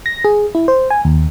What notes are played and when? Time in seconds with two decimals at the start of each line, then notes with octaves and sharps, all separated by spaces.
0.06 A#6
0.25 G#4
0.55 E4
0.68 C5
0.91 G#5
1.05 D#2